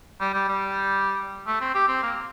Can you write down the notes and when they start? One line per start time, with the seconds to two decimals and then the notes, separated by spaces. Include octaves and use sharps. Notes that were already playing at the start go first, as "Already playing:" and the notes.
0.21 G3
0.34 G3
0.48 G3
1.47 A3
1.61 C4
1.75 G4
1.88 C4
2.03 A#3